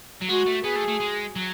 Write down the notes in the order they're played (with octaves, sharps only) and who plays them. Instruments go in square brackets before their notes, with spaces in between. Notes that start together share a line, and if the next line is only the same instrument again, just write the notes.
[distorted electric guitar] F#3
[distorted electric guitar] G#3 [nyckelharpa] F#4
[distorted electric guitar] A3
[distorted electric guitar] B3 [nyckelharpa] G#4
[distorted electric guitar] A3
A3
G#3
F#3